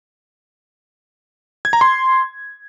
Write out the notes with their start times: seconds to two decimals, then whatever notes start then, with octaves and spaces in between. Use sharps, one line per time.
1.65 G#6
1.73 A#5
1.81 C6